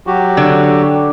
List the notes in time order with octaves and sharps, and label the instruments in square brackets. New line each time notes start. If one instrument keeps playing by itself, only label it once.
[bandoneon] F#3 F#4 G4
[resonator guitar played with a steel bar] D3